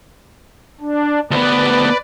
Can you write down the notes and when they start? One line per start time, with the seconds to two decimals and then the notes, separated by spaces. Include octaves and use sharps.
0.81 D4
1.31 D2 B3 B4 D5